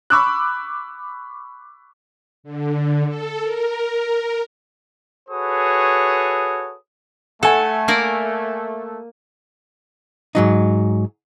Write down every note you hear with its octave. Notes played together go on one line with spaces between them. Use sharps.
B5 C#6 D6 E6 F#6
D3
A4
A#4
F#4 G#4 A4 B4 C#5 D#6
A3 A4 F#5 G#5
A#3 A#4 D5
G#2 F#3 D#4